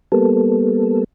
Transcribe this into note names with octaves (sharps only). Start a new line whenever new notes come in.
G3 A#3 B3 A4